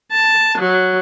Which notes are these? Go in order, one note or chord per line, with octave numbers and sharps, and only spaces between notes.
A5
F#3